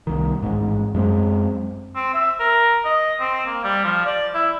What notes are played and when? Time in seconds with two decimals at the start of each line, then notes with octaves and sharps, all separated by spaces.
0.07 C2 D#3
0.42 A1 G#2
0.94 F#2 G#3 C4
1.96 C4
2.14 E5
2.40 A#4
2.85 D#5
3.20 C4
3.47 A#3
3.64 G3
3.85 F3
4.06 D5
4.34 E4